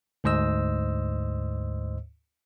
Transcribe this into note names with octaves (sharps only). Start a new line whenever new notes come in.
D2 G#2 C5 D#5 E6